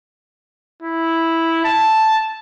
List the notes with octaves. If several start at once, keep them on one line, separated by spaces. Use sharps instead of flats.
E4
A5